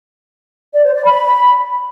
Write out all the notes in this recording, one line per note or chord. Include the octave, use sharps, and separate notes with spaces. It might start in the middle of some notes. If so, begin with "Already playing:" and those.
D5
C5
D5
B5